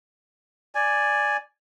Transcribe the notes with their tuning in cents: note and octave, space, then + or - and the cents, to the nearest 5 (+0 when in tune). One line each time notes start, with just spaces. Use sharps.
D5 +0 G#5 +0